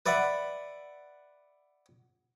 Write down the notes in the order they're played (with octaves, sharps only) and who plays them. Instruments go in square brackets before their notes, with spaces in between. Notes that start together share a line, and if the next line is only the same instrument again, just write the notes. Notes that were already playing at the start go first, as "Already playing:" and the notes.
[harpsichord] B4 D5 E5 F#5